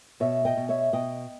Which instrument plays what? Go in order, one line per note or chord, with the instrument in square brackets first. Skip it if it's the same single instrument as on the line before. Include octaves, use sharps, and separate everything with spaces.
[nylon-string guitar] B2 C#5 E5
D#5 G5
B2
C#5 E5
B2 D#5 G5